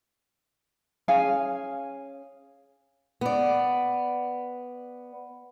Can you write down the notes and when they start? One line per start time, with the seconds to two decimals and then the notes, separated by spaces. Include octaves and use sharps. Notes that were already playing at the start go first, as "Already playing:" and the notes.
1.08 C#4 G#4 F5 G#5
3.21 B3 D5